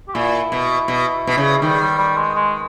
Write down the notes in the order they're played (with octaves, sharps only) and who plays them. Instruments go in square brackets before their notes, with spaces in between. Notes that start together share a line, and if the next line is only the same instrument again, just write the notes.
[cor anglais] G4
[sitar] A#2 [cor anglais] E4
[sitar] B2
B2
B2
C#3
[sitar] D#3 [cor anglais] G3
[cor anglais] G3
G3
G#3
G#3